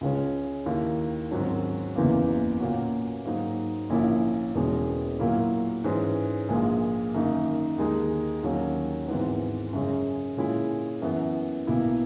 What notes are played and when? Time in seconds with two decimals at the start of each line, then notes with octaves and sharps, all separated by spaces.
0.01 C#2 C#3 G#3 C#4
0.66 D#2 D#3 A#3 E4
1.31 G#1 G#2 D#3 F#3 C#4
1.96 F#1 E2 C#3 E3 A#3
2.60 A#2 A#3 C#4 F#4
3.25 G#2 F#3 A#3 D#4
3.90 A#1 A#2 A#3 C#4 E4
4.55 E1 E2 B2 G#3 C#4
5.19 A#2 F#3 A#3 E4
5.84 G#2 E3 G#3 C#4
6.49 A#1 A#2 G#3
7.14 F#2 D#3 A#3 D#4
7.78 D#2 D#3 G#3 D#4
8.43 D#2 D#3 F#3 A#3 C#4
9.08 G#1 G#2 E3 B3
9.73 F#2 C#3 G#3 C#4
10.37 A#2 G#3 C#4 E4
11.02 F#2 E3 B3
11.67 B1 B2 A#3 E4